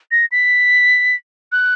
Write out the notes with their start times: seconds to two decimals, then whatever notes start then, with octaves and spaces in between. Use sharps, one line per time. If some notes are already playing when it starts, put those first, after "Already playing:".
0.11 A#6
0.32 B6
1.52 F#6